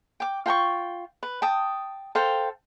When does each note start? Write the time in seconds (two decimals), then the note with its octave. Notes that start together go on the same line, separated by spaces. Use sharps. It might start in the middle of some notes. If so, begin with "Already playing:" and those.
0.20 G5 D6
0.46 F4 G5 A#5 C#6
1.23 B4
1.42 G5 A5 D#6
2.15 A4 C5 F5 G5